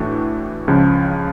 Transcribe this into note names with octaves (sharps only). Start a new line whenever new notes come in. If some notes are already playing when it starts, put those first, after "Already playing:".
Already playing: A2 E3 A3 D4 F#4
C#2 C#3 F3